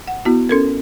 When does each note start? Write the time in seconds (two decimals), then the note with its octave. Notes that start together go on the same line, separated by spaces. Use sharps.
0.08 F#5
0.25 B3 E4 F#4
0.49 C#4 A4 A#4